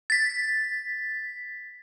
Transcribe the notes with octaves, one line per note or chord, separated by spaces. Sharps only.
A6 B6